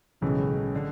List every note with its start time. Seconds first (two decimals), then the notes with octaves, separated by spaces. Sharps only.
0.22 B1 A2 C#3 E3 G#3
0.75 D3